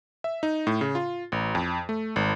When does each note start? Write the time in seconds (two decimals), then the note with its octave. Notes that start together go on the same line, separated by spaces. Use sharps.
0.24 E5
0.43 D#4
0.67 A2
0.81 C#3
0.95 F4
1.32 A1
1.55 F2
1.89 A3
2.16 G#1